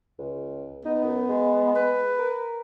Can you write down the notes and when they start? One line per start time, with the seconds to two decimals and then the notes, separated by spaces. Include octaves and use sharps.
0.19 C#2
0.85 B3 D#4
1.03 F#2
1.28 G#3
1.75 B4
2.18 A#4